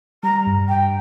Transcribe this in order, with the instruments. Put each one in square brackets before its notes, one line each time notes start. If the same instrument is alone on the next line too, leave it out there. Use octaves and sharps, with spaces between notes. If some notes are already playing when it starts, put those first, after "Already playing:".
[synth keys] G3 [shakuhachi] A#5
[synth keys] G2
[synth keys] G2 [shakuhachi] G5